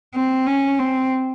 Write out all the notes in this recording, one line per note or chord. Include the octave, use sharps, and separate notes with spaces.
C4
C#4
C4